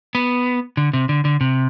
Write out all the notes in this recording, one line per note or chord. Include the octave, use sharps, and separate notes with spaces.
B3
D3
C3
D3
D3
C3